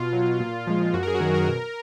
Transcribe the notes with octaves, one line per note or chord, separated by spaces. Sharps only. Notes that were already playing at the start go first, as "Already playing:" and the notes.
Already playing: B2 F4
F#3
A#2
F3 G#3
F#2 F#4
A#4
G#4
F#4
D#3 F#3 G#4
A#4
B2